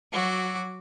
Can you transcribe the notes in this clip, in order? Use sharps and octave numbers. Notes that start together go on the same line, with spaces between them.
F#3 F#4 D6